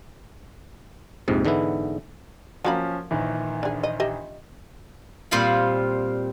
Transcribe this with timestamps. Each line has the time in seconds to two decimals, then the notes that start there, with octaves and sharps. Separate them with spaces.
1.28 A#1 F2 G#2 C3
1.45 G#2 D3 E3 B3 E4
2.65 F3 F#3 A#3 C#4 B5
3.11 A#1 D#3 E3
3.63 D4 G#4
3.83 D#5
4.00 G4 D#5 E5
5.31 A#2 G3 C4 F4 C5 B5